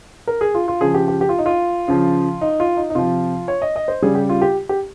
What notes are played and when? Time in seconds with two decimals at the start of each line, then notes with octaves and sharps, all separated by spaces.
0.27 A#4
0.41 G#4
0.55 F4
0.68 F4
0.81 C#3 F3 G#4
0.94 G4
1.08 G4
1.21 G4
1.29 F4
1.38 D#4
1.46 F4
1.88 C#3 F3
2.41 D#4
2.60 F4
2.77 D#4
2.90 D#4
2.95 C3 F3 F4
3.48 C#5
3.62 D#5
3.76 D#5
3.88 C5
4.02 C#3 G3 G#4
4.15 G4
4.29 F4
4.42 G4
4.69 G4